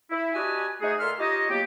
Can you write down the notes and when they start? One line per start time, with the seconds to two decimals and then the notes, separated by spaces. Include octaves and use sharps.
0.10 E4
0.34 D4 F#4 G4 B4 D#5 G#5
0.81 G#3 A3 D#4 F#4 G#4
0.99 A#2 A4 E5 C6 F6
1.19 D#4 F4 G4 C#5 D#5
1.50 F#3 A#3 B3 G4